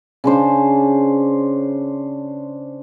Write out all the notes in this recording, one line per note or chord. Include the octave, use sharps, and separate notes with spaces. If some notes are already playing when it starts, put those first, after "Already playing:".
C#3 D4 C5